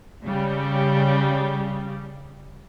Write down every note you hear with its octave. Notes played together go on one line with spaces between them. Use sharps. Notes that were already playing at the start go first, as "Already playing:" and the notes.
C#3 G3